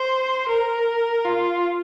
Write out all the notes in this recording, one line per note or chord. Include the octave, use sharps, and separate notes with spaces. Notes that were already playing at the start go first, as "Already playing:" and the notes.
Already playing: C5
A#4
F4